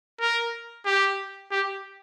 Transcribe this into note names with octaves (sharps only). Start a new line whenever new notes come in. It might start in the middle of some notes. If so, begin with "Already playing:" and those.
A#4
G4
G4